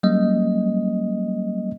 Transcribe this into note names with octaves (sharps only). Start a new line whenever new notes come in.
F#3 G3 A#3 C#4 D#5